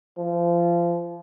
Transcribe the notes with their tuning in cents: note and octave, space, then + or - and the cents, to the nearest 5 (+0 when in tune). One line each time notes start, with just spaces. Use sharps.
F3 -25